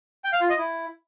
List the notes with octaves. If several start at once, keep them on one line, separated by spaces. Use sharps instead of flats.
G5
F5
F4
D#5
E4